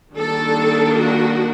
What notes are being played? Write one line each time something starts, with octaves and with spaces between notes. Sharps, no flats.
D#3 G3 A#3 D4 A4
F#4